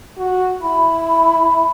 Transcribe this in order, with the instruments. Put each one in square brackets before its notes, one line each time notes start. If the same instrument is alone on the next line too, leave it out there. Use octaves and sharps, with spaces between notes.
[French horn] F#4
[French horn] E4 [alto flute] B5